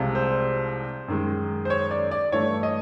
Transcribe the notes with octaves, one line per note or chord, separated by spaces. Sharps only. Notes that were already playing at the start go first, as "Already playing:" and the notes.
Already playing: C2 C3 F3 G#3
C5
F#2 D#3 G#3
C5
C#5
D5
D5
G2 E3 A3 C#5
D#5